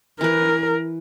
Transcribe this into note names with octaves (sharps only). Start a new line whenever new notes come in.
E3 A#4 B4